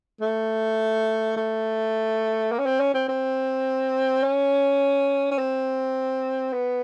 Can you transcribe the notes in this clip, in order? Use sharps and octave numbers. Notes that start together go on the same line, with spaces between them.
A3
A3
A#3
C#4
C4
C#4
C4
C4
C#4
C#4
C4
B3